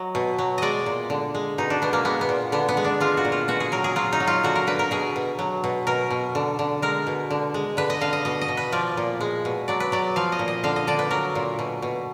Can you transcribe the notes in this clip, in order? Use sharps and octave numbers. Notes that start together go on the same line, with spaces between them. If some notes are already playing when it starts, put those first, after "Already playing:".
Already playing: F#3 D#5
B2
F#3
G#3 D5 D#5
A#2
D3
G#3
B2 D#4
D4
B2 B3
A#3
G#3 B3
B3
A#2
D3 B3
B3
G#3
D4
G#3 F4
F#4
A#2
F4
B2 F#4
G#4
F#3 A#4
G#4
F#3 F4
D#4
F#3
F4
D3 F#4
A#4
D3 B4
A#4
B2 G#4
B2
F#3
B2
B2 A#4
B2
D3
D3
G#3 A#4
B2
D3
G#3
D3 B4
D#5
D3 F5
D#5
B2 D#5
D#5
B2
B4
F3 D5
A#2
G#3
B2
F#3 D5
B4
F#3 D5
F3 F5
D#5
A#2
D#5
D3 F5
D#5
D3 D5
B4
F#3 A#4
A#2
B2
B2